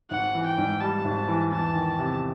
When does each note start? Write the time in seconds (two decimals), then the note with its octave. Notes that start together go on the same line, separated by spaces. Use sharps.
0.10 G#1 F#5
0.34 E3
0.46 G5
0.58 G#2
0.81 G3 A5
1.05 G#1
1.28 E3
1.52 E2 A5
1.75 D#3
1.98 C3